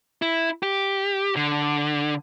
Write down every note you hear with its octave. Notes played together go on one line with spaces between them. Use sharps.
E4
G4
D3